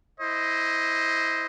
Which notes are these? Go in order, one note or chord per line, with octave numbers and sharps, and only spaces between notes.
E4 C5 D#5